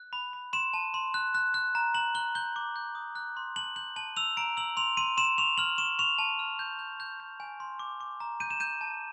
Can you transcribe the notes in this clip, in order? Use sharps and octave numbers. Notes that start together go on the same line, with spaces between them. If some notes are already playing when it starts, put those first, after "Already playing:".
Already playing: F#6
B5
B5
C6 E7
A5
C6
F#6
F#6
F#6
A#5
A#5 F#7
F#6 G7
G6 G7
D6
G6
D#6
F#6
C6
A5 F#7
G6 F#7
A5 F#7
E6 F7
A#5 D7
E6 F#7
C6 F7
C6 D#7
C6 E7
C#6 F7
F6 F#7
C#6 E7
C#6 F7
A5
F6
G6
G6
G6
G6
G#5
C6
D6
D6
A#5
G6 D#7
E7
G6 D#7
A5